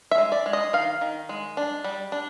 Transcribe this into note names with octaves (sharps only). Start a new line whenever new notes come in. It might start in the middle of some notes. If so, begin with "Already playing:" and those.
E5
G#3
D5
G#3
D#5
D#3 F5
D#3
G#3
D4
G3
D4